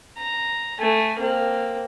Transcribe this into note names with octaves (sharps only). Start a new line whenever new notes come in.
A#5
A3 G#5
A#3 C4